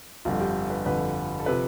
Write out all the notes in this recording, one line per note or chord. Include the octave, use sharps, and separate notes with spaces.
G1 F2 D3 F4
G4
B4
G1 F2 D3 B4
A4
C3 F3 B4